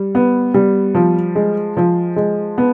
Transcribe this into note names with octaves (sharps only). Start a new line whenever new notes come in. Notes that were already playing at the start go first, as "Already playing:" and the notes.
Already playing: G3
B3
G3
F3
G#3
F3
G#3
B3